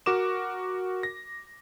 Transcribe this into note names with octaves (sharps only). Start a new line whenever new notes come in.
F#4 A#4 D6 E7
A#6